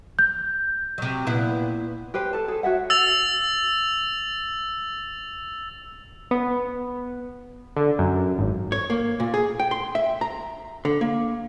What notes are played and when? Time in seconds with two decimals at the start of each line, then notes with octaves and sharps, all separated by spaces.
0.19 G6
0.98 C3 F#3
1.27 A#2 B3 E4
2.14 G4 B4 C5
2.33 A4 A5
2.48 G#4 A4
2.63 F#4 C#5 E5 F#5
2.90 E6 A6 F7
6.31 B3
7.76 D3
7.99 F#2
8.39 G#1
8.72 C#5
8.90 A#3
9.20 A#2
9.34 G#4
9.60 G5
9.71 C6
9.95 E5
10.21 A#5
10.85 D3
11.01 A#3